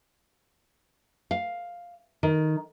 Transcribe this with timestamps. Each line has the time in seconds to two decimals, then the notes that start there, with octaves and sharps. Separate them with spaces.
1.31 F5
2.23 D#3